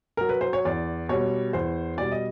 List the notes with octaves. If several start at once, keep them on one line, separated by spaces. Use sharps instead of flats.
F#3 A#4
B4
C5
C#5
E2 D5
B2 G3 C#5
E2 C5
B2 G3 D5
D#5